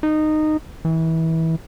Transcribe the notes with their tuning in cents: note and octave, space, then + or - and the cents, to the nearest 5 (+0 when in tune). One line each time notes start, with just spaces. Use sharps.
D#4 -15
E3 -25